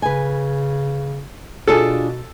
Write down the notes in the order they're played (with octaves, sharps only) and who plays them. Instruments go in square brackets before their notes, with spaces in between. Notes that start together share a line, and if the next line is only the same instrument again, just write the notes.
[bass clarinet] C#3 [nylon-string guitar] B4 G#5
[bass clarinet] B2 [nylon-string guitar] D4 F4 G#4 [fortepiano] A4